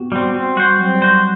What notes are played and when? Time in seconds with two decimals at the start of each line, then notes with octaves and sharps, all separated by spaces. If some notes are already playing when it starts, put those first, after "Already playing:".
Already playing: B3 F#4 G4
0.12 G3 C4 F#4
0.34 C4 F#4
0.56 G3 F#4 C5
0.79 F#3 C4
0.94 G3
1.02 F#4 C5